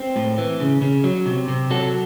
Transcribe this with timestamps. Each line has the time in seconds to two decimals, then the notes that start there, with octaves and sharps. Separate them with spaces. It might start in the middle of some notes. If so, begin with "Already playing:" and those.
Already playing: C4
0.16 A2
0.38 E3
0.60 C#3
0.82 C#3
1.04 F#3
1.26 C3
1.48 C3
1.70 F#3 F#4 A4